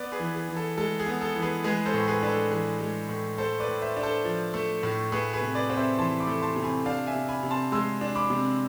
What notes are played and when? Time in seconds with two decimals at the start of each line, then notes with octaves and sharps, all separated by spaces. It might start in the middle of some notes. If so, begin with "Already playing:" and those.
Already playing: B3 B4 D5
0.12 G#4 B4
0.20 E3
0.35 G#4
0.49 E3
0.56 A4
0.77 G#3 A4
0.99 G#4
1.06 B3
1.21 A4
1.36 E3
1.42 G#4 B4
1.64 G#3 G#4 B4
1.85 A4 C5
1.94 A2
2.07 G#4 B4
2.23 D4 B4
2.29 A4
2.51 E3 G#4 B4
2.81 G#3
3.09 A2
3.38 A3 A4 C5
3.60 B4 D5
3.67 A2
3.82 C5 E5
3.96 D4
4.03 A4 C5
4.25 F3
4.54 A3
4.83 A2
5.12 A3 G#4 B4
5.33 G#4 B4
5.41 C3
5.55 B4 D5
5.70 C4
5.77 C5 E5
5.98 E3 A5 C6
6.20 B5 D6
6.27 A3
6.42 A5 C6
6.56 C3
6.64 G#5 B5
6.85 D4 F5 A5
7.07 E5 G#5
7.15 C3
7.28 G#5 B5
7.43 C3
7.51 A5 C6
7.72 G#3 C6 E6
8.01 D4
8.15 B5 D6
8.30 C3